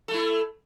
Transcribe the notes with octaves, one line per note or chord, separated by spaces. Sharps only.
A3 E4 A4